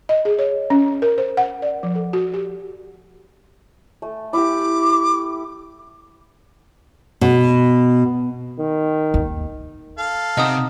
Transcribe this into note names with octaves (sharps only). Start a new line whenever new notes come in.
D#5
G#4
C#5
C#4
A#4
C5
F#5
D5
F3
A4
F#4
G4
A3
E4 G4 D6
B2
D#3
D#2
A4 F5
C3 D#4 D#5 F#5 D#6